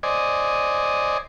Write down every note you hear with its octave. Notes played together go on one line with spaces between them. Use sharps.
C5 D5 D#5 G#5